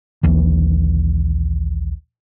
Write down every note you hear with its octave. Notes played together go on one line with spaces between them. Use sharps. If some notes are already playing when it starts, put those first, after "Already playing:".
A#1 D#2 E3